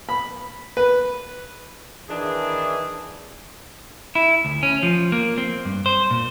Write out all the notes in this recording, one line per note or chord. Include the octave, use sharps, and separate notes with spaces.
B5
B4
D#3 E3 D4 G#4
E4
D2
C#4
F3
A#3
C4
G2
C5
A#2